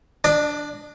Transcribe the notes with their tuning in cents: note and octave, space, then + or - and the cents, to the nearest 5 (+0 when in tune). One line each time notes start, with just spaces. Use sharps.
D4 +0 D5 +25